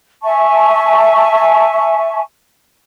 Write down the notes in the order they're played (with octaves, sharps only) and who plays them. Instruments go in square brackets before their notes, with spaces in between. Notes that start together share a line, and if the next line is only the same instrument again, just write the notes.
[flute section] E5 G#5 A5 C#6